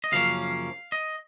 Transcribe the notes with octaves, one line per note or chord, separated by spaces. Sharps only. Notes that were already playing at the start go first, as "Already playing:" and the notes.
D#5
F#2 C#3 F3 A#3 C#4 F5
D#5